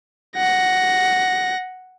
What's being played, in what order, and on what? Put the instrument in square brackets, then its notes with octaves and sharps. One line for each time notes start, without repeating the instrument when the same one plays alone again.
[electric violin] F#5 A#6